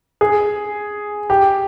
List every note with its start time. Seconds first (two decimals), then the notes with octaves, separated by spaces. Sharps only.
0.21 G#4
1.30 G4